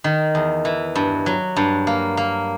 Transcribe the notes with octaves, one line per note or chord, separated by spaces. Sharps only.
D#3
E2
E3
G2
F#3
G2
A#3
A#3